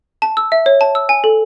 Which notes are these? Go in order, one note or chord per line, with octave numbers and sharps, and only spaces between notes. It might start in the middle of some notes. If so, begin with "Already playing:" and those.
A5
E6
E5
C#5
A5
E6
G#5
A4